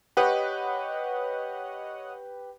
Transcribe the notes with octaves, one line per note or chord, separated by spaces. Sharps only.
G4 B4 C#5 D#5 F#5